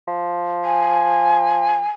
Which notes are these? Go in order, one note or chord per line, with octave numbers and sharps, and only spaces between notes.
F3
G#5